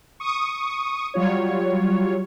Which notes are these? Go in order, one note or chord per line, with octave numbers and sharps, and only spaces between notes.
C#6 D#6
F#3 G3 F4 C#5